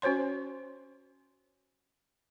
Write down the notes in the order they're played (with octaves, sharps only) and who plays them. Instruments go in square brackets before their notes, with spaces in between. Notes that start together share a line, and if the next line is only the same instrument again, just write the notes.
[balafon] C#4 F#4 C5 C#5 C6